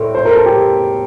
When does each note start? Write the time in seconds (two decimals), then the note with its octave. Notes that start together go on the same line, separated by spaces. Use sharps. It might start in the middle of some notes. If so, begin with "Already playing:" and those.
Already playing: A2 G3 C4
0.15 C5
0.25 A#4
0.35 A4
0.46 G4